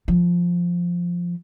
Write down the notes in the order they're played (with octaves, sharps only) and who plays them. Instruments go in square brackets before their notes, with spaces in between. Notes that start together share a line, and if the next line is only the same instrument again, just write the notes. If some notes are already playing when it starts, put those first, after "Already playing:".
[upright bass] F3